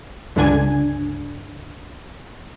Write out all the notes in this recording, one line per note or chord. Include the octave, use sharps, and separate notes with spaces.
C#2 G2 D3 D4 G#5 G#6